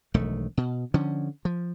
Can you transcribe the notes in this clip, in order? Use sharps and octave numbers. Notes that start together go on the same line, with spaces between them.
E1 B1 D#3 A3
B2
D3 F3 C#4
F3